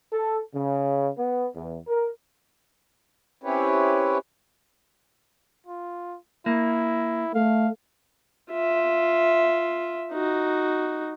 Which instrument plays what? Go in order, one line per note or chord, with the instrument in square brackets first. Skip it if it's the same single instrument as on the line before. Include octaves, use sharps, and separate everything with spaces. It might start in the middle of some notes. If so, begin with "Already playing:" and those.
[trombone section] A4
C#3
B3
E2
A#4
[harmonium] C4 C#4 E4 G4 B4 C#5
[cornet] F4
[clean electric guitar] A#3 [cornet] E4
[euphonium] A3 [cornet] F5
[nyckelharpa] F4 E5
D#4 F#4